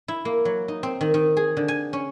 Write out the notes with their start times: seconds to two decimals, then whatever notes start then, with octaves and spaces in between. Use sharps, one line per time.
0.08 E4
0.25 A#3
0.45 F#3
0.68 D#4
0.83 C4
1.01 D#3
1.14 D#3
1.37 G#4
1.57 D3
1.68 G#5
1.93 C#4